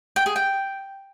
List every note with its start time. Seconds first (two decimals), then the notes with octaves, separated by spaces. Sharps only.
0.16 G5
0.26 G#4
0.36 G5